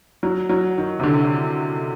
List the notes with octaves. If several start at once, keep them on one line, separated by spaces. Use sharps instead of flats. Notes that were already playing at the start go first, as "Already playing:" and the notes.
F#3
F#3
D#3
C3
D3